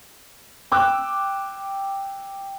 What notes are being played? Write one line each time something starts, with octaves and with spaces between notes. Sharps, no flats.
G5 D6 E6 F#6